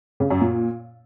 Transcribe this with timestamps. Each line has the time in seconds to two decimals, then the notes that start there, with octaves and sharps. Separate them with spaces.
0.20 C#3
0.30 F#2
0.41 A#2